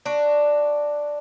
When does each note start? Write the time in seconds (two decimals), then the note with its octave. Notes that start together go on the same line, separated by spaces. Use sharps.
0.05 D4 F#4